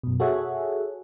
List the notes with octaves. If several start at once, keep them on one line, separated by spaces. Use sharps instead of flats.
F#2 B2
F#4 G#4 A4 C#5 E5 F#5